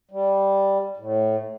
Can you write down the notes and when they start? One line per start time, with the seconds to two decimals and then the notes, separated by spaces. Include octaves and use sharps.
0.11 G3
0.97 A2